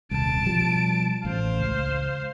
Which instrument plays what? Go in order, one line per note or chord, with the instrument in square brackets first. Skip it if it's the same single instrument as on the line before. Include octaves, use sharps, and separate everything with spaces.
[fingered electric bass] D#1 C2 [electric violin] A5 D7
[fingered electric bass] B2 F3 G3
[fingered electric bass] A1 [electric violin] C5 F5
[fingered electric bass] C#2